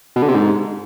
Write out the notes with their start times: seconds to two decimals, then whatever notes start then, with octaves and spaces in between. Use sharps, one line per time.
0.16 B2
0.22 D3
0.28 C3
0.35 G#2